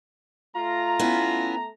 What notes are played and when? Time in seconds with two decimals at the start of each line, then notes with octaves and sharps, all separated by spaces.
0.55 A3 F4 A#5
0.99 B3 C#4 E4